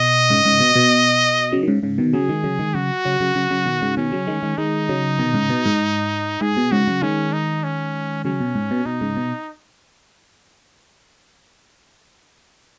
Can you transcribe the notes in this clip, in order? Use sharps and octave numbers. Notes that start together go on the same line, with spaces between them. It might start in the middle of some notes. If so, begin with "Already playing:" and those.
Already playing: B2 D#5
G#2 C#3
G#2 C#3
B2
B2
C#3 F#3
D#3
G#2 C#3
G#2 C#3
B2 D#3
C#3 F#3 G#4
D#3 G#3
C#3 F#3
D#3 G#3
C#3 F#3 F#4
C#3 F#3
C#3 F#3
C#3 F#3
C#3 F#3
B2 D#3
G#2 C#3
B2 D#3 C#4
C#3 F#3
D#3 G#3
D#3 G#3
D#3 G#3 D#4
C#3 F#3
B2 D#3
G#2 C#3
B2
G#2
G#2 G#4
B2
G#2 C#3 F#4
C#3 F#3
D#3 G#3 C#4
D#4
C#4
C#3 F#3 C#4
B2
G#2
B2
B2 D#4
G#2 C#3
B2